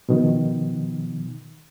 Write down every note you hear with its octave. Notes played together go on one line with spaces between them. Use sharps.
B2 D#3 F3